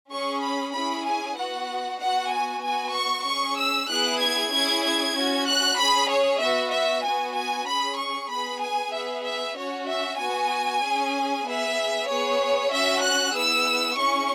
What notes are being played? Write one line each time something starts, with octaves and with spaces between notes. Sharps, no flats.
C#4 G#4 C#6
B5
C#4 E4 G#4 B5
G#5
B3 F#4 F#5
B3 F#4 F#5
G#5
B3 F#4 G#5
C#6
C#4 G#4 C#6
E6
B3 E4 G#4 F#6
G#6
C#4 E4 G#4 G#6
G#6
C#4 F#4
F#6
C#4 G#4 B5
C#5
B3 F#4 E5
E5
B3 F#4 G#5
G#5
C#4 G#4 B5
C#6
B3 G#4 B5
G#5
B3 G#4 E5
E5
C#4 F#4 C#5
E5
B3 F#4 G#5
C#4 G#4
B3 G#4 E5
B3 G#4 C#5
C#4 F#4 E5
F#6
B3 E4 G#4 E6
C#4 E4 G#4 C#6